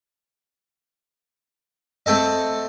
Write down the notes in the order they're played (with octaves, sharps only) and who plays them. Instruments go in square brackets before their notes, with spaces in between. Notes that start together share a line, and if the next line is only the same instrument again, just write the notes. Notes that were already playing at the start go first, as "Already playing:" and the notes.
[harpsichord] A3 C4 A4 D#5